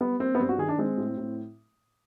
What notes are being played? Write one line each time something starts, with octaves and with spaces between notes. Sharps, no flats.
G3 B3
A#3 C4
B3
G2 C4
F#4
D#3 G#4
D4
G#3 C4
A2
A2